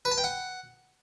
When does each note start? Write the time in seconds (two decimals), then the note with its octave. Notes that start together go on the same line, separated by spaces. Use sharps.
0.05 B4
0.11 A5
0.18 G5
0.24 F#5